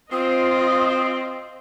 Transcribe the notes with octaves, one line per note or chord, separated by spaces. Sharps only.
C4 F4 D#5 D#6